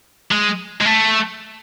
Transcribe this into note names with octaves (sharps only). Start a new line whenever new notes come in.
G#3
G#3
A3